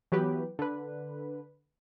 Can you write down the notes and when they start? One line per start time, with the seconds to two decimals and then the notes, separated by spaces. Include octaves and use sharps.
0.12 E3 F#3 B3 G4 B4
0.59 D3 B4